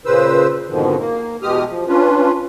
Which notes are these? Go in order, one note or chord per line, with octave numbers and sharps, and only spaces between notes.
A#2 C#3 B4 C5 E6
F2 G#2 B2 D3 D#3 F3
A#3
E2 B2 G#3 G4 D#6 F6
F3
C#4 D4 F4 B4